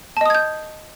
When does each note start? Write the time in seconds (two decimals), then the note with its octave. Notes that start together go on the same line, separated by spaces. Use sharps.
0.17 A5
0.21 D#5
0.26 D#6
0.30 G#6
0.35 G6